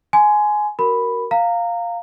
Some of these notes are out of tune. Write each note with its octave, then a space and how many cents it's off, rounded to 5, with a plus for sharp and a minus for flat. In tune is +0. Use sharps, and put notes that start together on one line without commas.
G#5 +15 C6 -25
F#4 +25 A#4 +0 B5 +0
F5 +0 A#5 -20